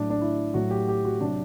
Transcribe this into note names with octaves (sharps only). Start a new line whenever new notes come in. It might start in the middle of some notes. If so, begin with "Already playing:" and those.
Already playing: A2 F#3 D4
D4
E4
A2 F#3 F#4
G4
G4
F#4
C3 F#3 D4